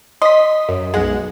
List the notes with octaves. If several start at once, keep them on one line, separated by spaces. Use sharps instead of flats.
D#5 C6 B6
F#2
B1 G#3 F#5